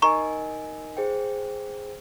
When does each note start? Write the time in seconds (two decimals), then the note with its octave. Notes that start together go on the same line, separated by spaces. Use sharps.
0.02 D#4 A#4 D#5 G#5 A#5 C#6
0.97 G#4 C5 G5